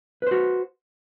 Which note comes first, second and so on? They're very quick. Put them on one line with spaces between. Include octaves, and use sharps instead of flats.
B4 C5 F#4